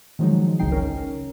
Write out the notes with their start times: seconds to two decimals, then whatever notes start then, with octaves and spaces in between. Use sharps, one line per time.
0.19 D#3 F3 F#3 G#3 D#4
0.59 G1 C#2 C#3 D#4 G5 C7
0.72 C#4 A#4